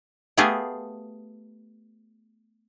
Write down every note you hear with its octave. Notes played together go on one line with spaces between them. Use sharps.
A3 B3 G4 G#4 F5